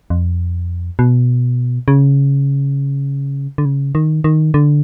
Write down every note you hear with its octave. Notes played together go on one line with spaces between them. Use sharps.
F2
B2
C#3
D3
C#3
D#3
D#3
D3